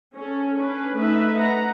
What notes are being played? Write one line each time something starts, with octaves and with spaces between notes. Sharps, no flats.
C#4 A4
C#4 D4 B4
A3 D#4 B4 E5
F#5 A#5